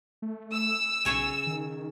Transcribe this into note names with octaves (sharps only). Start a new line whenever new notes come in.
A3
E6
B1 C#3 C#5 G#5
D#3